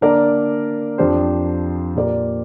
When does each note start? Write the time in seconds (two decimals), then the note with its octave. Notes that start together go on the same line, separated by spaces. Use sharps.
0.01 D3 A#3 D4 A#4 D5
0.98 F2 F3 D4 G4 C5
1.95 A#2 A#3 G4 A#4 D5